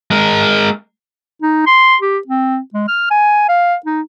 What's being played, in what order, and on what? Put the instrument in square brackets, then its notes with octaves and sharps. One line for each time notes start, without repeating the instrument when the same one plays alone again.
[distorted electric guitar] G#3 A#4
[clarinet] D#4
C6
G4
C4
G#3
F6
G#5
F5
D#4